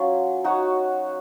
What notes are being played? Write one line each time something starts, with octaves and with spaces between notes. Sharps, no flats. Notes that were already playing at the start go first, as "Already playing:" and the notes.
Already playing: F#3 C#4 F4
D#4 F#4 C#5